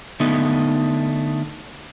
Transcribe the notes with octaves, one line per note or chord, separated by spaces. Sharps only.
D3 A3 B3 D#4